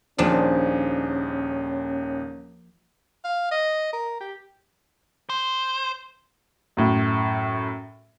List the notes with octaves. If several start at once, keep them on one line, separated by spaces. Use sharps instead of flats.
D#1 D#2 F3 C#4 D4 G#4
F5
D#5
A#4
G4
C5
F#2 A2